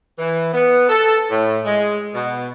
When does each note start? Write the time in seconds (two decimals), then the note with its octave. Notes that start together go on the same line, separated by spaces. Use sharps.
0.18 E3
0.54 B3
0.89 A4
1.30 A2
1.65 G#3
2.15 B2